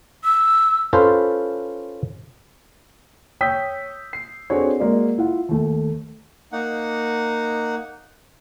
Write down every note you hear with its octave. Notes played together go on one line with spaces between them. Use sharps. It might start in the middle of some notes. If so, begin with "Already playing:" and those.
E6
C#4 F4 A4 B4 C5
C#5 G5 D#6 E6 G6 B6
C7
C4 D4 F#4 G#4 A4 C#5
G#3 A#3 F#4 D5
E4 F4 F#5
D#2 A3
A#3 D#4 F#5